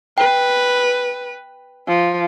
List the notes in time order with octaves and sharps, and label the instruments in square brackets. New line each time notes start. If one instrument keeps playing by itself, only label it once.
[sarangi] B4 [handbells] G5
[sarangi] F3